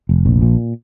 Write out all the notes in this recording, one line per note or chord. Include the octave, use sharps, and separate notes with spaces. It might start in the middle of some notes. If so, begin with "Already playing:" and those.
F1
A#1
A#2